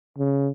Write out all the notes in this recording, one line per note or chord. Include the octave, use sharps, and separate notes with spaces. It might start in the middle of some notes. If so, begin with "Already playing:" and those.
C#3